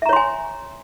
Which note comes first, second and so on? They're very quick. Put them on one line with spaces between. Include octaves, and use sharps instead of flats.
E5 A#5 C#5 C6 G#5